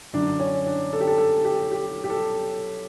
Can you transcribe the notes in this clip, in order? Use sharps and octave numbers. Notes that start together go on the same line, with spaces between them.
F#2 D3 F#3 D4
C#4
D4
A4
G4
A4
A4
G4
G4
G4
A4